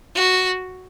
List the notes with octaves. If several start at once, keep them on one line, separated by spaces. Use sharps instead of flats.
F#4